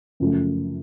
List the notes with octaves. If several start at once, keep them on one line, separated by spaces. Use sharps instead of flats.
F#2 C#3 F3 A3